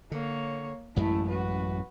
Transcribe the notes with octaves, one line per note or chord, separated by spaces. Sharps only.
D3 A#3 C#5
A1 F#2 G#3 A3 E4
F#4 B4